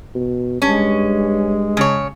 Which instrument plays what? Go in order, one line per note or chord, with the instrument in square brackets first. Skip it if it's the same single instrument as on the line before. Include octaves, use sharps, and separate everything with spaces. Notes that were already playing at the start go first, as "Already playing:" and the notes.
[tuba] B2
[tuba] G2 [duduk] G#3 [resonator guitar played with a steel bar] C#4
[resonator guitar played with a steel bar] C#3 C#5